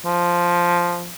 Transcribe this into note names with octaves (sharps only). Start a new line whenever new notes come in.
F3